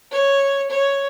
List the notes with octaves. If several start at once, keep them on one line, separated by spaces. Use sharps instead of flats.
C#5
C#5